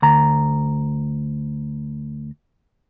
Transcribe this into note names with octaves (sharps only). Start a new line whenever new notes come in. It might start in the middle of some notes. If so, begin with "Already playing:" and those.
D2 A#5